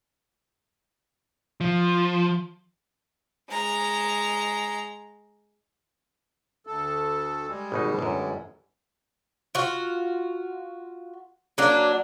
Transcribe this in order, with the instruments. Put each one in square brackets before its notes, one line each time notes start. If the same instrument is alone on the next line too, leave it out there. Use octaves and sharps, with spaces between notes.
[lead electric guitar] F3
[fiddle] G#3 A#5
[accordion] D2 A4
G3 G#3
[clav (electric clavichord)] G#1 B2 D#4
G1 F#2
[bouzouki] F4 F#4
F#3 A#3 D4